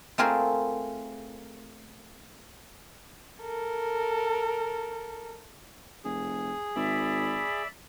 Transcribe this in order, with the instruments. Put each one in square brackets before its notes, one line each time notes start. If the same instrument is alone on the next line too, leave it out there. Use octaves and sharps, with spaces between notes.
[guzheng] A3 C4 F4 G#4 A#4 C5
[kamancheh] A4 A#4
[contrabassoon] F1 [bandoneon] G#4
[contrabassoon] G#1 [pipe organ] D5 E5 B5